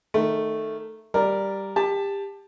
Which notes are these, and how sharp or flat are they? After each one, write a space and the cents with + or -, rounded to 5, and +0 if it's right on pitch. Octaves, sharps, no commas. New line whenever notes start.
D#3 -10 A3 +0
G3 +0 A#4 +0 D5 +0
G4 +25 A5 +0